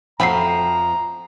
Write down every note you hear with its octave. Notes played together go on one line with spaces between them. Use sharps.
F2 F3 F#3 A3 G5 A#5 B5 C7